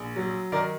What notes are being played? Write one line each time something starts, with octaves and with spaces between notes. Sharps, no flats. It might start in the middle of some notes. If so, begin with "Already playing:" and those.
Already playing: A#1
F#3
D#3 A#4 D5